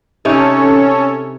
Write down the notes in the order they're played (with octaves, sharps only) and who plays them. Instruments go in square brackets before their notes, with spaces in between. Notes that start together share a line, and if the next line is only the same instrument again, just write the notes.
[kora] C3 D#4 [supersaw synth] C#4 A4 C#5